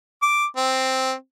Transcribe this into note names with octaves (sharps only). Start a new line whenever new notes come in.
D6
C4